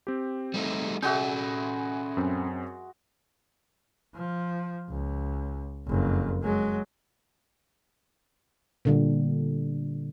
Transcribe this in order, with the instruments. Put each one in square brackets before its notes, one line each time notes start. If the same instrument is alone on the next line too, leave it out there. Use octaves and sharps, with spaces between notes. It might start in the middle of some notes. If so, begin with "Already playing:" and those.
[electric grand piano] C4 G4
[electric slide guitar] G3 A3 D#4
[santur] G#3 F#4 E5 [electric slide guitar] C#4 A4 D5 [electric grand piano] G6
[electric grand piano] F#2 C4
[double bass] F3
C#2
F#1 F2
F#3 G#3
[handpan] A#2 D3 G3